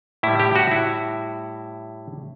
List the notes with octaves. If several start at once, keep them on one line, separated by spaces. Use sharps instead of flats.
A2 G3 E4
G4
F#4
E4